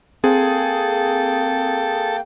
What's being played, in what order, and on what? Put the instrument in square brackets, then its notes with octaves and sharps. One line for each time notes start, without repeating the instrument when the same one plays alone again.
[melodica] A#3 G5 [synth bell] C4 [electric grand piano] G#4 [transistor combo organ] A4